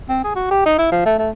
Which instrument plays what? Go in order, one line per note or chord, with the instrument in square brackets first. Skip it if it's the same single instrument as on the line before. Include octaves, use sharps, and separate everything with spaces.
[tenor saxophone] C4
G#4
F#4
G4
D#4
E4
F3
A3
A3